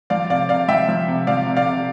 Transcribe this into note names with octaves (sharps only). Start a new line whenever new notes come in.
F3 D5 F5
C3 D5 F5
C3 D5 F5
F3 E5 G5
F3
C3
F3 D5 F5
C3
D5 F5
C3